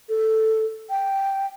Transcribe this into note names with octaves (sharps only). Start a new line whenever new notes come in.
A4
G5